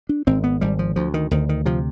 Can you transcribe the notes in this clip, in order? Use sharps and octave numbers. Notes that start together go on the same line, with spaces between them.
D4
G#1 C4
B3
G#1 G3
F3
D2 F3
D#3
D2 D#3
D#3
C3 F3